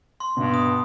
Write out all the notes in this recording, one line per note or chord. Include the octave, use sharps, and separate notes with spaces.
C6
G2 B2
D#6